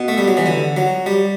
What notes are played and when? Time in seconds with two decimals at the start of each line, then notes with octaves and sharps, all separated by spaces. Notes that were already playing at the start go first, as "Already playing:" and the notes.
Already playing: B2
0.08 A3
0.18 G3
0.28 F#3
0.37 E3
0.46 D3
0.77 F#3
1.06 G3